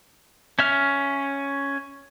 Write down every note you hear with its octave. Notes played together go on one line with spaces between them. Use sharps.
C#4 E5 F6